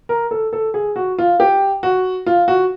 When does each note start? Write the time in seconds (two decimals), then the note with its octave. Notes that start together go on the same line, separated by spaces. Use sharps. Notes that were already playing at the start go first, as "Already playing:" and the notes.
0.09 A#4
0.31 A4
0.53 A4
0.74 G#4
0.96 F#4
1.18 F4
1.40 G4
1.83 F#4
2.26 F4
2.48 F#4